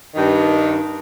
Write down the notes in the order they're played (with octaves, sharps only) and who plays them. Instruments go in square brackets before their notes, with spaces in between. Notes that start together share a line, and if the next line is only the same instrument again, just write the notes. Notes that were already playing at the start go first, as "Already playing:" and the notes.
[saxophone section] G2 D#3